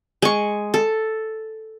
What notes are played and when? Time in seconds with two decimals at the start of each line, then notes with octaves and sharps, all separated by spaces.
0.22 G#3 C#6
0.74 A4